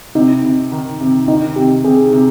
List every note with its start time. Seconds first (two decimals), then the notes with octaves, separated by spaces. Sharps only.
0.15 C3 D#4
0.44 C3
0.72 D#3
1.00 C3
1.28 D#3 D#4
1.56 C3 G4
1.84 C3 G#4
2.13 C3